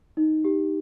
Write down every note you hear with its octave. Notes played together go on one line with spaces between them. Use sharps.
D#4
G4